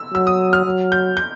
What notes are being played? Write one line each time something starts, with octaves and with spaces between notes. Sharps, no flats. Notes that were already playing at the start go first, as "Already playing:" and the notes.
Already playing: E6
F#3 E6
D#6
F6
F#3
G6
G6